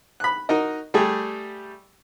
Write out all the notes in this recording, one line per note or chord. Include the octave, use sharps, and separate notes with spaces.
B5 F#6
D#4 F#4 A#4 D#5
G3 A3 G4 G#4